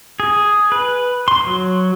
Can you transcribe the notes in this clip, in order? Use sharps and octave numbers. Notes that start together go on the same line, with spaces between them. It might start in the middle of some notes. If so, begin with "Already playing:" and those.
G#4
B4
C6
F#3